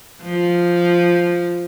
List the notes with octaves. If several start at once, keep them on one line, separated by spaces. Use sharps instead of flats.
F3